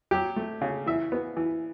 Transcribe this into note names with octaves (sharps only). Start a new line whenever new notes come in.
F#3 G4
A3
C#3
E3 E5
B3
E3